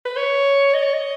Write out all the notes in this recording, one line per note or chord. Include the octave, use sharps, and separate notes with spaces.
B4
C#5
D#5
C#5
D#5